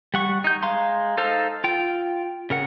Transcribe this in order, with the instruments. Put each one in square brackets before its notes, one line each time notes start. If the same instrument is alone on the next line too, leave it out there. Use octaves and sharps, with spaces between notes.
[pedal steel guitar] G3 F#5 C#6
D#4 G6
G#3 F5 A#5 C6
D#4 A4 C5 F5
F4 G5
C#3 A#4 F#5